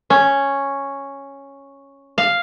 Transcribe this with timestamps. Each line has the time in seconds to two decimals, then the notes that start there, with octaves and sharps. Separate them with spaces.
0.10 C#4
2.18 F5